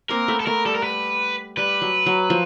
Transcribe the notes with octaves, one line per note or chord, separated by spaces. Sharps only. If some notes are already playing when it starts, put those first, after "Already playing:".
A#3 C4 A#4
A3 B3
A4
A3 B3 A#4
G3 A4
A#4
B4
G3 B4
F#3
F#3
F3